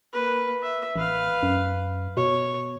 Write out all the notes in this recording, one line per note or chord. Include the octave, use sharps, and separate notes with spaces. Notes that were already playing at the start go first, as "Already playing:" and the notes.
A#3 B4
E5
A1 B4 F5
F#2
B2 C#5